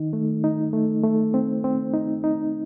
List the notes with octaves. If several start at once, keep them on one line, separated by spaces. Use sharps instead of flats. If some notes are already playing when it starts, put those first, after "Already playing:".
Already playing: D#3 D#4
A3
D#4
A3
A3
C4
C4
D#4
D#4